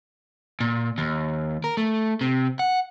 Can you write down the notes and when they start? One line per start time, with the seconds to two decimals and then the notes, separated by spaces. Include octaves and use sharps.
0.60 A#2
0.98 D#2
1.64 A#4
1.77 A3
2.21 C3
2.59 F#5